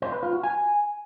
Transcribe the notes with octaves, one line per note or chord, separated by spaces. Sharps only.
C5
B4
F4
F#4
G#5